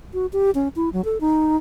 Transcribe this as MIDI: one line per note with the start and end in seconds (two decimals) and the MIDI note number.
0.14 0.26 66
0.33 0.51 67
0.55 0.68 61
0.76 0.89 64
0.93 1.04 54
1.05 1.20 69
1.21 1.56 63